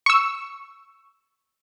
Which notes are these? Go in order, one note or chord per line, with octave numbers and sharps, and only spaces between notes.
C#6 E6